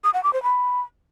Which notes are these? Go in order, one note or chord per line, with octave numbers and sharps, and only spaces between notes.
D#6
F#5
D6
C5
B5